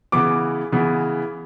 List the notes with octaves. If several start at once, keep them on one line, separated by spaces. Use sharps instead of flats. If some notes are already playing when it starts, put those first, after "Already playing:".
C#3 E3 B3 D6
C#3 E3 B3